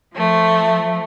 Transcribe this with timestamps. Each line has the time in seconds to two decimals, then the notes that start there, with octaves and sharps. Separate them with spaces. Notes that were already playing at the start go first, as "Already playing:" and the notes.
0.14 F3 A3